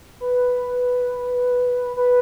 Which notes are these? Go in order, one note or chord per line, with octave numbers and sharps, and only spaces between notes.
B4
B4